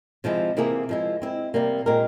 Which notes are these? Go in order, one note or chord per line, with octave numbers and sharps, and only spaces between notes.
C3 F3 G#3 E4
C3 E3 A#3 E4 G#4
F3 G#3 E4
G#3 C4 E4
C3 G3 A#3
A#2 G#3 C4 G4 A#4